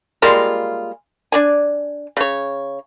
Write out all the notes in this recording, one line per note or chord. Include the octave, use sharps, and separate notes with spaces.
G3 G#3 A#3 F4
D4 D5 G#5
C#3 C#5